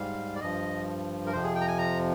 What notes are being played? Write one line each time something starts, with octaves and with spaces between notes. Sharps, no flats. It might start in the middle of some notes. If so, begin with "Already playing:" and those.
Already playing: G#2 G3 F5
D5
G2 F3 D#5
A#4
F2 C3 F3 C5
G#4
G5
A#5
G#5
A#5